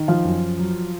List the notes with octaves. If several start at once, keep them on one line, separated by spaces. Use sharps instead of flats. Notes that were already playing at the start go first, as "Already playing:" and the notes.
Already playing: D#3
F3 F4
F#2
F#3